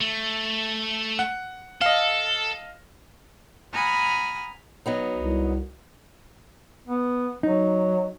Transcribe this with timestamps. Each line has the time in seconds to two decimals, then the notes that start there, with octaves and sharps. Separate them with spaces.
0.01 A3
1.19 F#5
1.81 A4 D#5 F5
3.73 F#5 G#5 A#5 B5 D#6 F6
4.86 F#3 B3 D#4
5.16 C2
6.87 B3
7.43 F#3 D#4